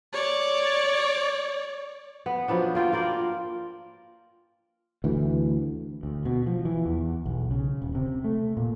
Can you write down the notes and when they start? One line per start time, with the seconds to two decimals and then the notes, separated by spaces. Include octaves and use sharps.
0.13 C#5 D5
2.26 B3
2.48 F3 F#3 B3 D4
2.75 A#3 F4 G5
2.93 F4 A#4 D5
5.04 D2 E3
6.03 D2
6.25 B2
6.47 F3
6.65 E3
6.86 E2
7.26 B1
7.51 C#3
7.82 D#1
7.95 C3
8.24 A3
8.57 A#2